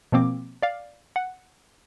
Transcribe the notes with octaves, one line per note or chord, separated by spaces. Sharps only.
B2 F3 A#3 C4 D6
D5 F5
F#5